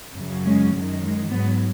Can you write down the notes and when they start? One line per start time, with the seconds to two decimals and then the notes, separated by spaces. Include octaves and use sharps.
0.16 F#2 C#3 F#3
0.45 G#3 C#4
0.73 F#2 D#3 G#3
1.02 G#3
1.31 G#2 F#3 B3